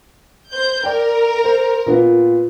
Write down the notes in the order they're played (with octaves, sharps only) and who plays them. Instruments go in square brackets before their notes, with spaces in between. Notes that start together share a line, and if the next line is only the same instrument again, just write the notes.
[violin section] C5 G6
[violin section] A#4 [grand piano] D5 G5
[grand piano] C5
A#2 B3 F4